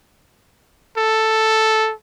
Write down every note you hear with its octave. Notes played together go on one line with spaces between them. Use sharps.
A4